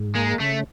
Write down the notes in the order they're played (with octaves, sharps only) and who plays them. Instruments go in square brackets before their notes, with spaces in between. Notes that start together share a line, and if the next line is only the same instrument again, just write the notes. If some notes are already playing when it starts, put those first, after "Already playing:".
Already playing: [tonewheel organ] G#2
[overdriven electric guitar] G#3 [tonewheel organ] A#3
[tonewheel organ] C#3 [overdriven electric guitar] A3